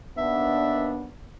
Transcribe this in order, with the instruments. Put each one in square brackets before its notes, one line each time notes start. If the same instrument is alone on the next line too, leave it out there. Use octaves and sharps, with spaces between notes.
[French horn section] D#2 B3 D4 [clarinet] E5